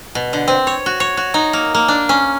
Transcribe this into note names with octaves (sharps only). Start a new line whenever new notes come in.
B2
D3
C4
C#5
F#4
C#5
F#4
D#4
A#3
A#3
D4
C#4